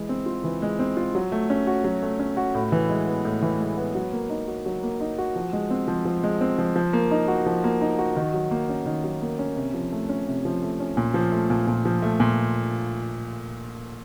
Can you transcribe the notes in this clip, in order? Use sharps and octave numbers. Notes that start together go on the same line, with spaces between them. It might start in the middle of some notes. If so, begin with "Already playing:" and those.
Already playing: E3 G#3
C4
F4
E3
G#3
C4
F4
F#3
A3
C#4
F#4
F#3
A3
C#4
F#4
A2
E3
G#3
B3
A2
E3
G#3
B3
F#3
A#3
D#4
F#4
F#3
A#3
D#4
F#4
F3
G#3
C4
F3
F3
G#3
C4
F3
F3
A#3
D#4
F#4
F3
A#3
D#4
F#4
D#3
F#3
A#3
C#4
D#3
F#3
A#3
C#4
C3
F3
A3
C#4
C3
F3
A3
C#4
A#2
F3
A3
A#2
A#2
F3
A3
A#2